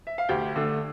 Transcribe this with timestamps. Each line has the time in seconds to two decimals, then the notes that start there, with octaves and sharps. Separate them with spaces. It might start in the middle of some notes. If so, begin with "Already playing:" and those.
0.07 E5
0.18 F5
0.29 D2 G4 G5
0.56 D3 A3